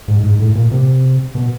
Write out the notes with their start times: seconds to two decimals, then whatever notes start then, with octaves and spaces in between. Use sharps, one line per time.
0.08 G#2
0.24 G#2
0.39 A2
0.55 A#2
0.71 C3
1.35 B2